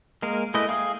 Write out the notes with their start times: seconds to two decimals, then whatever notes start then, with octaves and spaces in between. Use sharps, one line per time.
0.22 G#3 A#3 G#4 A#4
0.54 G#3 A3 E4 B4 D#5
0.69 G#4 F5 G5 D#6